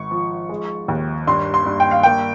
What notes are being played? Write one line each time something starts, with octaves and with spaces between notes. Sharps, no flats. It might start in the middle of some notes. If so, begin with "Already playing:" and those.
Already playing: G#1 C#6
F3
G#3
D#2
G2 C6
C6
G2
G5
F5
A#3 G5